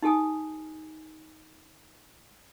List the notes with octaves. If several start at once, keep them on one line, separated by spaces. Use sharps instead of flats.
D#4 G4 A4 G#5 D#6